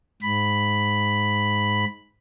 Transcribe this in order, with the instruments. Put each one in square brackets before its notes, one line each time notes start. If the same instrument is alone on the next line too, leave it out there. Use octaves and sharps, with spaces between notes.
[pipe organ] G#2 B5